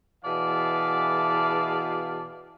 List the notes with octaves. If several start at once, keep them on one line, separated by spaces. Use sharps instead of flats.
B2 E3 G#4 D5 F5 A5